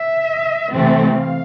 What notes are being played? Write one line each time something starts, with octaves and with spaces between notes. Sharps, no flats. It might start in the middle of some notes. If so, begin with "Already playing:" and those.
Already playing: E5
C3 E3 A3 C4
F5